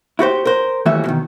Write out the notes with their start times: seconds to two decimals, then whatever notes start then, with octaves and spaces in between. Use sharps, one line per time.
0.19 E4 F#4 G4 C5
0.45 A#4 C5
0.86 D#2 E3 G3 A3 F#4 E5
1.05 B2 D#3